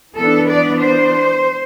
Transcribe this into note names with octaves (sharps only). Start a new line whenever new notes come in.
E3 B3 D4 A4
D5
C5